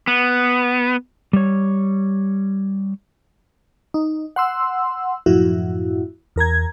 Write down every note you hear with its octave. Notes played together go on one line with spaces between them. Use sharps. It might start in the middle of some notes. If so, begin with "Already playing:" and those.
B3
G3 C#5
D#4
F#5 C6 E6
F#2 A2 F3 E4 F#4
E2 A#4 A#5 G#6